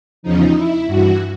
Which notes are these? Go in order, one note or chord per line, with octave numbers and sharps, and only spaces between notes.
E2 C#3 F3 D#4
E4
G2 E3 F#4